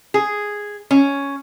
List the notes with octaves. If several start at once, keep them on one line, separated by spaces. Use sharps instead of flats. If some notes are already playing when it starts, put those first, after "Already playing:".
G#4
C#4